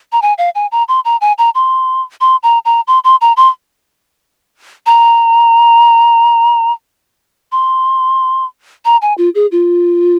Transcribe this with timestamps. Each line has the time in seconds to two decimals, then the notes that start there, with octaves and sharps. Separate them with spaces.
0.12 A#5
0.22 G#5
0.38 F5
0.55 G#5
0.72 A#5
0.88 C6
1.05 A#5
1.21 G#5
1.38 A#5
1.55 C6
2.21 C6
2.43 A#5
2.65 A#5
2.87 C6
3.04 C6
3.21 A#5
3.37 C6
4.86 A#5
7.52 C6
8.85 A#5
9.02 G#5
9.18 F4
9.35 G#4
9.52 F4